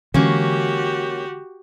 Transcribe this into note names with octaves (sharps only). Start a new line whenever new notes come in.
D3 E3 G#3 A#3 C#4 F#4 G4